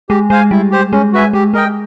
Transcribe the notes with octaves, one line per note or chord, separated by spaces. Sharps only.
G#3 G4
G#3 C5 F5 G#5
G3 E4
G4 C5
G#3 C#4
F#4 B4 E5 G#5
G#3 G4
G#3 A#4 D#5 G5